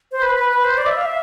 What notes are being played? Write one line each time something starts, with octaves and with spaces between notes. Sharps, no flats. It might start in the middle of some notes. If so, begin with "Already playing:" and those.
C5
B4
B4
B4
C5
D5
E5
F5
E5